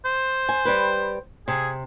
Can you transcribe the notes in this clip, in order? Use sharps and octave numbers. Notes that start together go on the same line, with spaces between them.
C5
G#5
G3 G4 B4
C3 G#4